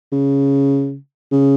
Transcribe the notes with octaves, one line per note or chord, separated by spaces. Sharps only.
C#3
C#3